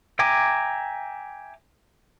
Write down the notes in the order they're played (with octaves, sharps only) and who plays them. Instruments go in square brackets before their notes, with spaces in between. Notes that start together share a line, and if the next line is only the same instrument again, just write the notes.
[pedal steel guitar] E5 G5 G#5 A#5 D6